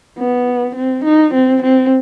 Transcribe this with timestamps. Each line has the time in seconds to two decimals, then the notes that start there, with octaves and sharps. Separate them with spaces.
0.18 B3
0.76 C4
1.04 D#4
1.34 C4
1.63 C4